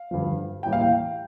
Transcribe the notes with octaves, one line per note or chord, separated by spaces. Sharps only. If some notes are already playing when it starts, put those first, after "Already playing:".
Already playing: F5
G2 D3 F3
A2 E3 G3 A#3 G5
F5
G5